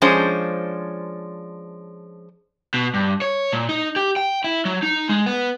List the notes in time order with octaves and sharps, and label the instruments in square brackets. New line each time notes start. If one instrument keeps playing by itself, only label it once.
[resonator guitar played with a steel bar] F3 G#3 C#4 D4 C5
[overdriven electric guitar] B2
G2
C#5
A#2
D#4
G4
G5
E4
F#3
D#4
G#3
B3